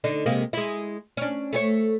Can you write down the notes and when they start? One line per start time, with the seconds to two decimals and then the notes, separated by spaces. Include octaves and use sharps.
0.04 D3 D4 D#4
0.26 C3 G#3 A#3
0.53 G#3 E4
1.17 C#4 D4
1.53 A3 G#4 C#5